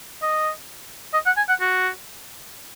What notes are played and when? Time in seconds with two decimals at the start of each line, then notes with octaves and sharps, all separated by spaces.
0.22 D#5
1.13 D#5
1.26 F#5
1.37 G#5
1.49 F#5
1.61 F#4